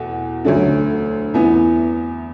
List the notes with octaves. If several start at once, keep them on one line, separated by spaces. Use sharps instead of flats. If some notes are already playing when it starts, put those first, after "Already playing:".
Already playing: E2 B2 A3 F#5
D2 D3 F#3 A3 D4
E2 E3 B3